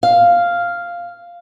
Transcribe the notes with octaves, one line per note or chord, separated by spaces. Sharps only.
F5